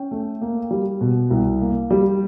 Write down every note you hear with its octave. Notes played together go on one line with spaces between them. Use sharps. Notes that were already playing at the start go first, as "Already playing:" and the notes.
Already playing: C#4 G5
A3
A#3
G3
B2
C2
A#3
G3